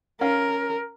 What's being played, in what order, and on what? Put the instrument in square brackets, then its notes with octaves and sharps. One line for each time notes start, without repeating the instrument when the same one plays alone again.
[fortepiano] C#4 F5 [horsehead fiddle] A#4